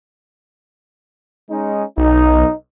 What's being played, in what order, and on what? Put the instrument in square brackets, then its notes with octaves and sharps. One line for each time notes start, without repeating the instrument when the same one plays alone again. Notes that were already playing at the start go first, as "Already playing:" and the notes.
[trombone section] G#3 C#4 D#4
[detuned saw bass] B1 [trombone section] D#4